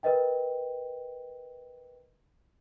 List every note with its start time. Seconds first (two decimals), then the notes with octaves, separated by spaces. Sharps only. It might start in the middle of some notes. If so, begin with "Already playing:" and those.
0.03 A#4 B4 D#5 G5